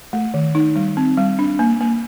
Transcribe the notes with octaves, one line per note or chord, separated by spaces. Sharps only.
A3
D#3
D#4
G3
C4
G3
D4
A#3
A#3